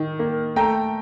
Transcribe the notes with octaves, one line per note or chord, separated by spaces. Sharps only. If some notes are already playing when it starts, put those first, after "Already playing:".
Already playing: D#3
A#3
A3 G5 A#5